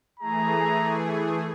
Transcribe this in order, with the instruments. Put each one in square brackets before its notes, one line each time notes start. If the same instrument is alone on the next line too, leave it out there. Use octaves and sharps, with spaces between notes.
[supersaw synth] E3 A3 G#4 [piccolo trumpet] A#5